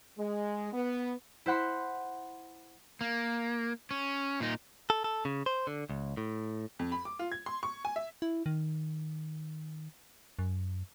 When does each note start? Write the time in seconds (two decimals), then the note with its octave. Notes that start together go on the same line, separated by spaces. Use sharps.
0.17 G#3
0.72 B3
1.46 E4 C5 F#5 B5 C6
3.01 A#3
3.91 C#4
4.40 A#2 D#4
4.90 A4
5.04 A4
5.25 C#3
5.46 C5
5.67 D3
5.89 C#2
6.17 A2
6.79 F2
6.92 B5
7.05 D6
7.19 F4
7.32 G#6
7.46 C6
7.63 C#6
7.85 G#5
7.96 E5
8.22 E4
8.46 D#3
10.39 F#2